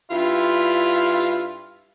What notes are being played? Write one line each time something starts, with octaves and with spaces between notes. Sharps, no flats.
G2 E4 F4